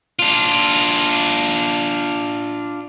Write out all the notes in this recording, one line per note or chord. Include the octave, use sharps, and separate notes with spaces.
D4 F4